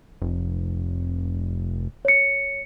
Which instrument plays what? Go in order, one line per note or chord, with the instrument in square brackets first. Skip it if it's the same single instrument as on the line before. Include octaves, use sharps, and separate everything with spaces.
[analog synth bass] F1
[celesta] C#5 C#7